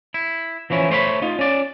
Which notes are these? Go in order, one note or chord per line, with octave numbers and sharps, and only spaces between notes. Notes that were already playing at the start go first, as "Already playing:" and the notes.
E4
E3 F3 C#4 E4
A3 C5 C#5 E5 B5
D#4 F4
C#4 D5